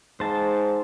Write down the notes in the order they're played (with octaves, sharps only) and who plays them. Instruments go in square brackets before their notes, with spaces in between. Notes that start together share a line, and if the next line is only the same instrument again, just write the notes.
[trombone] G#2 [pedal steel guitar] C5 A5